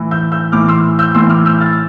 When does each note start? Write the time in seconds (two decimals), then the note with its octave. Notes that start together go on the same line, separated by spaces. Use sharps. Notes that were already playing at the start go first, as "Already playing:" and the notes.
Already playing: A2 E3
0.11 E6 G6
0.32 E6 G6
0.52 A2 E3 D6 F6
0.68 C6 E6
0.99 E6 G6
1.14 A2 E3 C6 E6
1.30 D6 F6
1.45 E6 G6
1.61 F6 A6